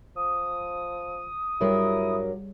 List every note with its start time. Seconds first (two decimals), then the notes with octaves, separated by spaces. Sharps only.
0.16 F3 D#6
1.61 G2 F#3 G3 E4 G#4 A#4 C#5